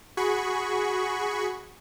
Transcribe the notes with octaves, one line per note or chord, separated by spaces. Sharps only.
F#4 G#4 B5 C#6